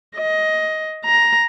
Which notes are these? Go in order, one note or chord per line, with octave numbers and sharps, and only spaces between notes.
D#5
A#5